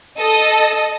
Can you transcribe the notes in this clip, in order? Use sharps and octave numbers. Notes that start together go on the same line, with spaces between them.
A4 D#5